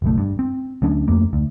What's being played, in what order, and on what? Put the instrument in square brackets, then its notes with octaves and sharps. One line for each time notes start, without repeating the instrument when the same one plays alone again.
[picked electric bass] F#1 B1 A3
G2
C4
D2 F#3 C#4 D4
F2 A3 A#3
D2